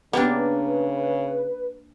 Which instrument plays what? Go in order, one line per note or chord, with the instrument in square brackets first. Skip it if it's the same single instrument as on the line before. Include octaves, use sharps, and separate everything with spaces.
[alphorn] C#3 [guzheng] A#3 D4 [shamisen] B3 G4 [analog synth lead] B4